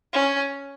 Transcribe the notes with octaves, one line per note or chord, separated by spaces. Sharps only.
C#4